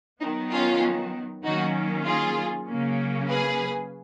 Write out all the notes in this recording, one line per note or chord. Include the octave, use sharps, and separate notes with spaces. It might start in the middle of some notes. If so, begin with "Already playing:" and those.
D#3 F#3 B3 D#4
C#4 F4
D#3 F#3 A#3 C#4 D#4 F#4
F4 G#4
C#3 F#3 A#3 C#4
G#4 B4